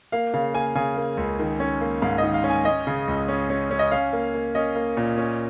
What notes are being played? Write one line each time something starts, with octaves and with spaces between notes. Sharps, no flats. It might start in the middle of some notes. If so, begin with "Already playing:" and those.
A#3 F5
C#3 F5
A#3 G#5
C#3 G#5
A#3
C#2
D#3
C#4
A#3
G#2 F5
D#5
D#3
F5
C#4
G#5
C#4 D#5
C#3
C#2
C#4
C#4
C#4
D#5
C#4 F5
A#3
A#3
C#4 D#5
A#3
A#2
C#4